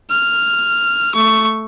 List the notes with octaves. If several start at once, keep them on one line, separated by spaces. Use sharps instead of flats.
F6
A3 C#6